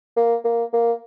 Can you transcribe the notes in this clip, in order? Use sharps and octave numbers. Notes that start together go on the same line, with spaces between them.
A#3
A#3
A#3